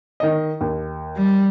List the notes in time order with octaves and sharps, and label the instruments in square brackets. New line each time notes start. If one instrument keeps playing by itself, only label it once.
[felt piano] D#3 D#5
D#2
[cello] G3